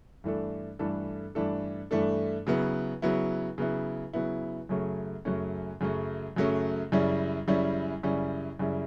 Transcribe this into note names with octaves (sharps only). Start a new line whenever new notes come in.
G2 E3 A3 D4 A4
G2 E3 A3 D4 A4
G2 E3 A3 D4 A4
G2 E3 A3 D4 A4
C#3 F#3 B3 E4
C#3 F#3 B3 E4
C#3 F#3 B3 E4
C#3 F#3 B3 E4
F#2 C#3 F#3 A3 C#4
F#2 C#3 F#3 A3 C#4
F#2 C#3 F#3 A3 C#4
F#2 C#3 F#3 A3 C#4
F#2 C#3 G3 C#4 E4
F#2 C#3 G3 C#4 E4
F#2 C#3 G3 C#4 E4
F#2 C#3 G3 C#4 E4